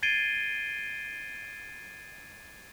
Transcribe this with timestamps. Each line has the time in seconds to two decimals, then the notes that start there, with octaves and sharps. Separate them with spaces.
0.03 G#6 A6 C7 D7 D#7 G7